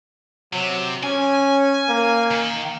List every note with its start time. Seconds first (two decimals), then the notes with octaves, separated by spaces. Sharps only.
0.53 C3 F#3
1.03 C#4 G#5
1.89 A#3
2.31 D#3